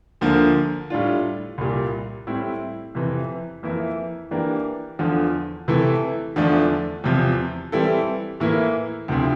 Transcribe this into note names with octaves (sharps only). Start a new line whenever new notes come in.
D2 D3 F3 A#3
A2 G3 D4 F4
C2 A#2 G3
A2 G3 C4 E4
F2 C3 E3
F2 E3 A#3 E4
E3 A#3 D4 G4 A#4
E2 D3 F3
C3 E3 A3 E4 A4
E2 D3 F3 A3 D4
E2 C3 F3
E3 G3 C4 E4 A4
A2 E3 A#3 E4
D2 C3 F3 C4 E4